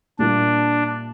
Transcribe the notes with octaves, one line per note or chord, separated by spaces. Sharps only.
A#2 G3 A#3 D4 E4